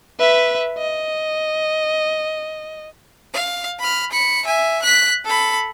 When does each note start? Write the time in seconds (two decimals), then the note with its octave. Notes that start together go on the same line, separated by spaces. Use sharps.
0.19 B4 E5
0.78 D#5
3.33 F5
3.79 B5 F6
4.11 B5 C#7
4.45 E5 G#5
4.82 F#6 B6
5.25 A4 B5